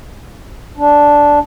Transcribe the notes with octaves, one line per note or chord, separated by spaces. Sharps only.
D4